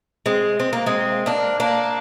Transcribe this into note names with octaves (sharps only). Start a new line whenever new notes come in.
G#3 C4
C4
A#3
G#3 C4
A#3 D4
A#3 D4